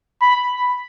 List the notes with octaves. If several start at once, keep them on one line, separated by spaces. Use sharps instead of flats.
B5